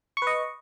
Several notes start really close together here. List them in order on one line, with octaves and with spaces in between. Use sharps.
C#6 B4 D#5